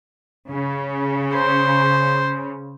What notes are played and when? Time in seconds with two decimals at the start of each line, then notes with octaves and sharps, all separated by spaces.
0.50 C#3
1.34 C5